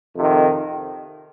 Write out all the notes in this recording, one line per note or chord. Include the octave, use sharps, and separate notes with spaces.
F2 C3 D#3